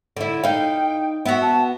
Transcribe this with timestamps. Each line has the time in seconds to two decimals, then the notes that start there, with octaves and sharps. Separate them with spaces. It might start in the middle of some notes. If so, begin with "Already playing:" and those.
0.17 D3 E4
0.44 D#4 F5 G5
1.25 B3 F#4 E5
1.41 A5